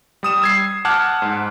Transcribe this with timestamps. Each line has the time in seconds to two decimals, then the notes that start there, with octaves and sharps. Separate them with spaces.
0.23 G3 D#6 E7
0.42 E6 G#6 C7
0.85 F#5 A5 D6 F6 F#6 G#6
1.22 G#2